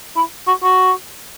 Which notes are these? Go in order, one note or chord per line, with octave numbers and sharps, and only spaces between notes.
E4
F#4
F#4